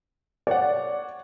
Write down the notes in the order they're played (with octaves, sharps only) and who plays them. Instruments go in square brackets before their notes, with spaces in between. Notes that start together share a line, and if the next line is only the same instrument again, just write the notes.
[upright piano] C#5 F#5 [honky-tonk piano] D5